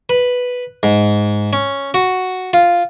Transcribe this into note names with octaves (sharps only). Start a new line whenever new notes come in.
B4
G#2
C#4
F#4
F4